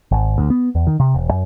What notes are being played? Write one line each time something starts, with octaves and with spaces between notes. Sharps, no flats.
G#1
D2
B3
E2
D#3
C3
E1
F#2